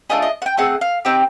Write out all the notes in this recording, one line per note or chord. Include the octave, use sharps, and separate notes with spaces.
A3 D4 F4 G#4 D#5
D#5
F#5
G5
A3 C4 G#4 F#5
F5
C4 D#4 G4 G5